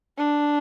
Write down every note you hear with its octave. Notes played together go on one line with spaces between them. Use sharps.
D4